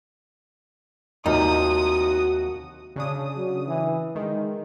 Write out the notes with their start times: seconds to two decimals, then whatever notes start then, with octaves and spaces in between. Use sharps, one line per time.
1.26 D#2 C3 F3 D#4 F#4 D#6
2.96 C#3 D4 D#6
3.36 F#3
3.67 E3
4.16 D#3 G#3